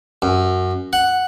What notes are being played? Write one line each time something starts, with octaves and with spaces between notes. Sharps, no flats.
F#2
F#5